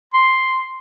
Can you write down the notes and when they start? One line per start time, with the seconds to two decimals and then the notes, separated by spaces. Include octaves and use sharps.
0.14 C6